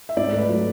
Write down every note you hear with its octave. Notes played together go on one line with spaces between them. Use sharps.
E5
G#2 D5
A3
B4
F#3